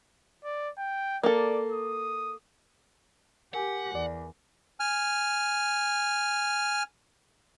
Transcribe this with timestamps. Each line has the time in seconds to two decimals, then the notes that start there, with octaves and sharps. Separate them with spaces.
0.44 D5
0.78 G5
1.23 A#3 A4 D5
1.72 D#6
3.54 G4 A#4 F#5 G#5
3.95 E2 D5
4.80 G#5 F6